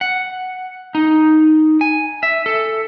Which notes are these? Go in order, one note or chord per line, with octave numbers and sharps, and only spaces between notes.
F#5
D#4
G#5
E5
A4